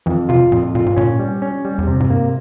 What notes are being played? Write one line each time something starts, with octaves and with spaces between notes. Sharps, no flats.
F2 E3
C3 F4
F2 A#2
A#2 F4
G#2
A#2 C#4
G3
C#4
G3
E2
F2 C3
G#2
G2 A#3